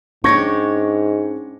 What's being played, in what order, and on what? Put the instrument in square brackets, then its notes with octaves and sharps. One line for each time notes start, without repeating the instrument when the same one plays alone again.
[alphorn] G#2 [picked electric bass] C#4 [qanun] D4 C#5 G5 [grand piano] C#6 G#6 A#6